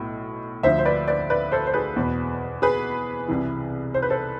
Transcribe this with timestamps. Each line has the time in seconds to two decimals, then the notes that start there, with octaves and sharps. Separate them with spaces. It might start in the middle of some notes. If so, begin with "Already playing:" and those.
Already playing: B1 A2
0.63 D2 D3 F3 C5 E5
0.79 C5
0.85 B4 D5
1.08 B4 D5
1.30 B4 D5
1.52 A4 C5
1.67 C5
1.74 G#4 B4
1.96 E2 B2
2.62 G#4 B4
3.28 C2 C3 E3
3.94 C5
4.02 B4
4.10 A4 C5